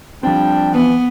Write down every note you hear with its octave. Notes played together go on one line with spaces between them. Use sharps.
F3 G3 C4 D4 G5
E3 B3